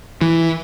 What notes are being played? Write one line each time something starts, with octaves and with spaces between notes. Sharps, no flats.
E3